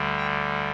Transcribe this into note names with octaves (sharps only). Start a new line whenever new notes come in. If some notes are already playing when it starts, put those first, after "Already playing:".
Already playing: D2 D3 G3
G5